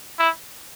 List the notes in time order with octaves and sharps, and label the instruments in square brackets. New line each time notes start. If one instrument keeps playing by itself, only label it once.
[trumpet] E4